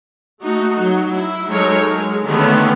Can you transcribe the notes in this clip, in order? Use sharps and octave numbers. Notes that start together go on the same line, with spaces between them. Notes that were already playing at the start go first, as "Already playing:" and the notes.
A3 D#4 F#4
F#3
E4
F#3 G#3 D#4 A4 A#4 C#5
G#3
D3 D#3 A3 B3 C#4